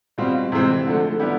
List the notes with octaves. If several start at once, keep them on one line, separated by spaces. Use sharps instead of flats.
B2 G3 C4 F4
C3 E3 G#3 C4
D3 F3 A3
D3 G3 B3 E4 G4